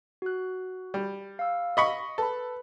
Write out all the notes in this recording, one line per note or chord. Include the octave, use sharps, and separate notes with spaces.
F#4 F#6
G3
F5 E6
D#5 B5 C#6
A4 B4 B5